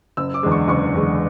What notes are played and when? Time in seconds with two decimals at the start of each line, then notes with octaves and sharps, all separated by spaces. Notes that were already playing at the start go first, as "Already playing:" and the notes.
0.17 F#1 E6
0.34 D6
0.43 E2 D3 G#3
0.52 C#6
0.68 F#1 C#6
0.94 E2 D3 G#3